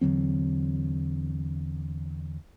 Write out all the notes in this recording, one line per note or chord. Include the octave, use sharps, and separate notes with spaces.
E2 D3 F#3 C4